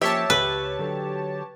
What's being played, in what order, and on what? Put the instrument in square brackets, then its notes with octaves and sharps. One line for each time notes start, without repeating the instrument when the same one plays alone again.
[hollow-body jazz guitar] F3 A#3 C#4 [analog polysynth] G4 C#5 A5 [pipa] E5
[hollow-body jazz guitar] C#2 [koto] B4
[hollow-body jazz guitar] D3 F#3 A4